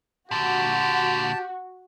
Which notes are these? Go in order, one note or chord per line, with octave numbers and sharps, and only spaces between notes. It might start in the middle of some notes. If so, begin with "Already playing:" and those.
A#2 D3 F#4 G4 A5